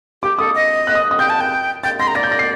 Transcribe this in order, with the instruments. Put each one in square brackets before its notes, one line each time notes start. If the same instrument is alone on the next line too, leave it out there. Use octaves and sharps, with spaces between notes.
[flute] G4 [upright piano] D6
[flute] A4 [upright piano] D#6
[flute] D#5
[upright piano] F#6
D#6
D#6
[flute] G5 [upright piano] G6
[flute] A5
G5
[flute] G5 [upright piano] A6
[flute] C6 [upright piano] A#6
[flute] A#5
[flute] D5 [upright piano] A#6
[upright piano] G6
A#6
C7